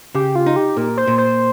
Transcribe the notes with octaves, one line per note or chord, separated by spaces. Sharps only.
C#3 G4
F4
D#4
G4
A#2 A#4
C5
A#2
C5